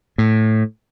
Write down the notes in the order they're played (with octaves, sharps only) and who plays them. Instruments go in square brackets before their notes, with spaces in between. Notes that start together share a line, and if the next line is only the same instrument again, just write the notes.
[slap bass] A2